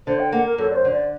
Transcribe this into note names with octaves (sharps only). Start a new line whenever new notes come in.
D3 C5
G5
A#3 F#5
A#4
F#2 A4
D5
C5
D3
D5